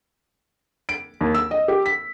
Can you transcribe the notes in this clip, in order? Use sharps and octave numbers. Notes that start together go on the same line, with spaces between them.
D7
D#2
E6
D#5
G4
B6